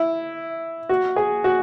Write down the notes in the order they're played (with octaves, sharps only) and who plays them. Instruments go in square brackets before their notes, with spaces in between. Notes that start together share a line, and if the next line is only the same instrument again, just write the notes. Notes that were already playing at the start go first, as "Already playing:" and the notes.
Already playing: [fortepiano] E4
F#4
G#4
F#4